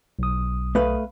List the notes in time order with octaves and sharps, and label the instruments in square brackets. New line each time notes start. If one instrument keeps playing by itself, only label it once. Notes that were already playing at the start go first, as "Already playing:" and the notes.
[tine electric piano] B1 D#6
[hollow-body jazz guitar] A3 B4 F5